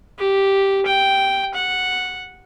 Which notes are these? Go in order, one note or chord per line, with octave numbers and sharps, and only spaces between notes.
G4
G5
F#5